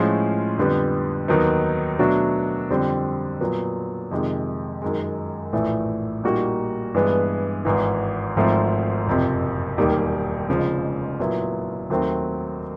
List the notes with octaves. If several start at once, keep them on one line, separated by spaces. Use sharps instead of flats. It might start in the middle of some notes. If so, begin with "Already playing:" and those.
Already playing: A2 F3 G#3 C#4 F4
F2 D3 G3 B3
D#2 D#3 F#3 B3 D#4
B2 F#3 A3 D4 F#4
F2 D3 G3 C4
A#2 F#3 B3
F2 C3 D#3 G#3
F#2 D#3 G#3
A#1 A2 E3 A3
A#2 G3 A#3 D#4 F#4
G2 E3 G#3 B3
G#1 G#2 E3
G#1 G#2 F3 A3 C4
F#1 F2 C3
E1 D#2 D#3 G3 A#3
F1 F2 C#3 F3 G#3
A#2 F#3 B3 E4
D#2 D#3 F#3 A3 C4